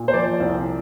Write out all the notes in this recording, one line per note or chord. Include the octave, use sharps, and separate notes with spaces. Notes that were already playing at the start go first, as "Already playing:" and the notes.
Already playing: A#2
C5
F3 D5
C2